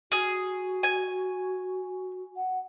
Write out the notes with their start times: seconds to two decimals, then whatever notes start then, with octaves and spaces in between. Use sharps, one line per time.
0.12 F#4 G#4
0.83 G#5
2.36 F#5